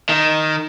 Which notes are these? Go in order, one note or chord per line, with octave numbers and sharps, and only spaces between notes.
D#3